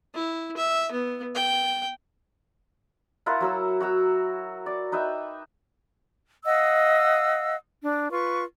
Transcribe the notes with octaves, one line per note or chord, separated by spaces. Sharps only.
E4
E5
B3
G5
E4 F4 A#4 F#5
F#3 A#4 E6
F#4 A#5 E6
D5
D#4 B4 E5 G5
D#5 F5 F#5 E6
D4
F4 B4 C#6